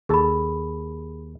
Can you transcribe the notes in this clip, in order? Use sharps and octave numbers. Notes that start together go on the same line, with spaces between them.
D#2 G#4 A4 A5 B5